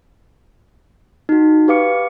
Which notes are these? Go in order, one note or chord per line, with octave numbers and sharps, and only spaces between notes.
D#4 F#4
G4 B4 F5 D6 C#7